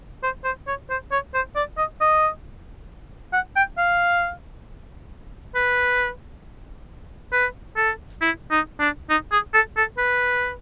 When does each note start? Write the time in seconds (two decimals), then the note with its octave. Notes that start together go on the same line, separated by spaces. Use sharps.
0.23 C5
0.45 C5
0.67 C#5
0.90 C5
1.12 C#5
1.34 C5
1.56 D5
1.78 D#5
2.01 D#5
3.33 F#5
3.56 G5
3.78 F5
5.55 B4
7.32 B4
7.77 A4
8.22 E4
8.51 D#4
8.80 D4
9.10 D#4
9.32 G#4
9.54 A4
9.77 A4
9.98 B4